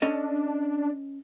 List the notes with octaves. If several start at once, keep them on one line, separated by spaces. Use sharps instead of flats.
C#4 D4 A4 D#5